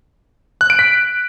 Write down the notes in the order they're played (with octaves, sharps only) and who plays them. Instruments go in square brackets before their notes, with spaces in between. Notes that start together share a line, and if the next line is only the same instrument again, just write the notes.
[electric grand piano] F#6
D7
B6